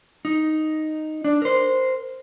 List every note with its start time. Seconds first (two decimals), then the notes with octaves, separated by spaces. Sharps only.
0.25 D#4
1.24 D4
1.42 A#4 C5